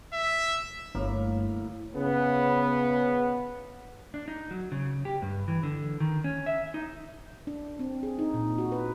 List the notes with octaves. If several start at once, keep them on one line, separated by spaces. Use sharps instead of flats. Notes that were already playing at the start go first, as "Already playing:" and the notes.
E5
G1 A2 A#3 F5
C#3 B3
D4
D#4
F#3
C#3
G4
G2
E3
D3
D#3
C#4
E5
D#4
D4
C4
G#4
D#4
A#2
F#4
B4